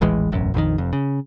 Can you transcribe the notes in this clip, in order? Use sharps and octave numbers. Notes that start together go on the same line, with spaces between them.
D#1 A1 E3 G#3
E1 A1 F#2
A#1 F2 D3 D#3
F1 F2
C#3